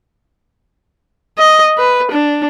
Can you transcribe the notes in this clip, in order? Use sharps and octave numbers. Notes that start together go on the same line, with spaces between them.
D#5
B4
D4